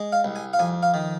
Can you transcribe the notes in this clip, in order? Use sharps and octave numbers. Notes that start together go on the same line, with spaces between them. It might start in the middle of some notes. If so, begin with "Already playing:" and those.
Already playing: G#3
F5
C2
G#5
F5
F2 G#5
F5
D#3